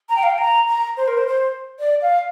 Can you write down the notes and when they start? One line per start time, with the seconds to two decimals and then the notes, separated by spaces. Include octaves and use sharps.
0.09 A#5
0.16 G5
0.23 F5
0.30 G5
0.38 A#5
0.68 A#5
0.97 C5
1.07 A#4
1.17 C5
1.27 C5
1.79 D5
2.01 F5